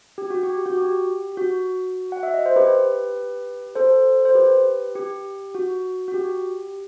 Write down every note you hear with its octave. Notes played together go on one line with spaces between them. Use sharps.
G4
F#4
G4
F#4
G4
F#4
F#5
E5
D#5
C5
G4 B4
A4 C5
C5
G4 B4
G4
F#4
F#4
G4